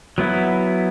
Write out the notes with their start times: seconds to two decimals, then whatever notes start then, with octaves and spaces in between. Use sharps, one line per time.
0.18 F#3 B3 E4